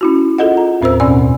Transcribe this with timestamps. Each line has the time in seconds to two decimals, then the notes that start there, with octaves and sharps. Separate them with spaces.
0.01 C#4 E4 F#4
0.38 F4 G#4 A4 D#5 F#5
0.57 A#5
0.81 D#2 A2 C4 A#4 C5 E6
1.00 F2 B2 C#4 D5 G#5 E6